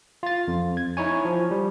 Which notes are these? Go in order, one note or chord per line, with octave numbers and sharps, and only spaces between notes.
F4 A6
F2
G#6
D#4 E4 C#5 G#5
F3
G3